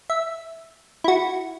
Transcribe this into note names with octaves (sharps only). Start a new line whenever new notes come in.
E5
E4 F#4